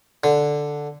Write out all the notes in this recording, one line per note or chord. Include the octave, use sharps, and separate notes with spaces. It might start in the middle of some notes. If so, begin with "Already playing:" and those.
D3